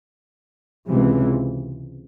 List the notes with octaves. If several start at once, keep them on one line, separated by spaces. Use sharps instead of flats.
C#2 C3 E3